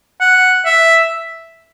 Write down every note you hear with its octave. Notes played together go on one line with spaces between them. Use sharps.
F#5
E5